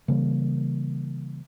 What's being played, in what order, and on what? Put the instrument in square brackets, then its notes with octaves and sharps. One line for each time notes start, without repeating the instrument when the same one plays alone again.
[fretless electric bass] C#3 E3 G3 A#3